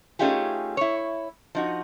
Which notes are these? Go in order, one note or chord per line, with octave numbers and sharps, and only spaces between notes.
A3 C#4 D#4 F4 G4 G#4
E4 C#5
F3 D#4 F#4